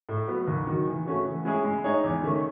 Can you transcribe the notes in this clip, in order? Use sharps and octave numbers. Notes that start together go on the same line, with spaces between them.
A2
F#3 B3
D#2
D#3 F#3
E3
A3 C#4 F#4
E3
G#3 C#4 E4 G#4
G#3
D#4 G#4 C#5 E5
E2
D#3 A3 C#4